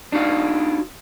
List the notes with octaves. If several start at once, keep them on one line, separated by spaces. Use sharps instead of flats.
D4 D#4 F#4 F5